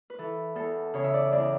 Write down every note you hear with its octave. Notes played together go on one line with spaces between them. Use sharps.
B4
E3 A4
E2 A4
C#3 C#5
E5
D5
E2 D5